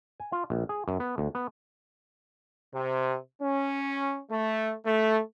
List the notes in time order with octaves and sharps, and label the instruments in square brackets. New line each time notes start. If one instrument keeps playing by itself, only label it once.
[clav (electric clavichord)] G#5
F4
A#1
G#4
F#2
B3
D2
B3
[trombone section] C3
C#4
A3
A3